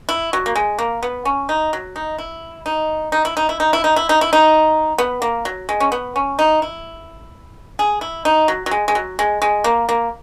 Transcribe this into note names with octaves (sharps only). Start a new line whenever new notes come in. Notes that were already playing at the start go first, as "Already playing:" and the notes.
E4
F#3
A#3
G#3
A#3
B3
C#4
D#4
F#3
D#4
E4
D#4
D#4
E4
D#4
E4
D#4
E4
D#4
E4
D#4
E4
D#4
B3
A#3
F#3
G#3
C#4
B3
C#4
D#4
E4
G#4
E4
D#4
F#3
F#3
G#3
G#3
F#3
G#3
G#3
A#3
A#3